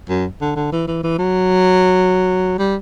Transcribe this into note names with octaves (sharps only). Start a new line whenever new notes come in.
F#2
D3
D3
E3
E3
E3
F#3
G3